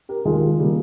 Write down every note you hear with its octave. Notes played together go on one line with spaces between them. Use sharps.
G4 A#4
D#2 D#3 G#3 F4 G#4
C#3 G3 A#3